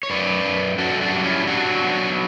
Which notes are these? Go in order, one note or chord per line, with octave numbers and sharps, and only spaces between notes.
C#5
F#2 B4 D5
F#2
F#2 F#4 A4
D4 F#4
G3
C#4 E4
F#3 D4 F#4
B2